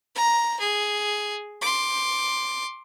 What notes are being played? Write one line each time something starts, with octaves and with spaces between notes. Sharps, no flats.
A#5
G#4
C6 D6